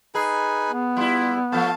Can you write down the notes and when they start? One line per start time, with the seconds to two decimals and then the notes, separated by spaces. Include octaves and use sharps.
0.15 D#4 G#4 B4 G#5
0.70 B3
0.97 G3 E4 F4
1.52 F3 A3 F5 A5